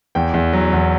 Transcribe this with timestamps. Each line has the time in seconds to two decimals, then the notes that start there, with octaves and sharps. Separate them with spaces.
0.15 E2 G5
0.34 E2
0.53 F#3
0.73 E2